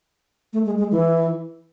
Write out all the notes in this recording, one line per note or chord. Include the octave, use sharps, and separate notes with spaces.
A3
G#3
G#3
E3